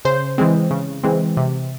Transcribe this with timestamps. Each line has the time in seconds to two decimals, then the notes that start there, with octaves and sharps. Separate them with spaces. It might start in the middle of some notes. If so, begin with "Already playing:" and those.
0.05 C#3 C5
0.38 E3 G#3 C4
0.71 C#3
1.03 E3 G#3 C4
1.37 C3